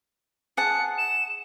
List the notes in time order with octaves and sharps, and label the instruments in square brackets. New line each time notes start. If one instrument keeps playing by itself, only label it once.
[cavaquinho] G#4 F#5 A5 [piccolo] C#7
[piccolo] E7